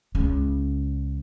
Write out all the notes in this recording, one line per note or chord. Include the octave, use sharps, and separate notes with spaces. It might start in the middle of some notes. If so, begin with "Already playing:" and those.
C#2 C#3